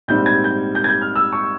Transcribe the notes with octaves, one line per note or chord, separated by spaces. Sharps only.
A#1 G#2 G3 C4 G6
G#6
G6
G6
G#6
G6
F6
E6
C#6